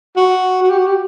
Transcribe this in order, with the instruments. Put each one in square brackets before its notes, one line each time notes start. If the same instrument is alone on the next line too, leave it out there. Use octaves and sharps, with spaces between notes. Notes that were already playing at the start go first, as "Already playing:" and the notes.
[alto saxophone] F#4
F#4
G4
F#4
G4